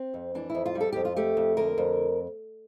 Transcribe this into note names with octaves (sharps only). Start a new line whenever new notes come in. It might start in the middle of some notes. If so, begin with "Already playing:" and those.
Already playing: C4
F2
E3 D4
E4
F2
F4
G3
A4
F2 G4
F4
A3 G4
F2
D3 A#4
F2